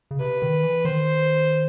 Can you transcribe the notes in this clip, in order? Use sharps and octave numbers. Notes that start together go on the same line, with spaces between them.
C#3
C3 B4
D#3
E3
D#3 C5